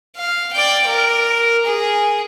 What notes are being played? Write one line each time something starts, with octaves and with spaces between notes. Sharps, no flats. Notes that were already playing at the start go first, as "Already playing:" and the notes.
F5
D5 G5
A#4
G#4